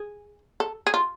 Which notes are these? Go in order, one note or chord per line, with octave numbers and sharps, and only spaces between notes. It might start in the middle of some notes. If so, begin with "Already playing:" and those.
Already playing: G#4
A4
G#4
F4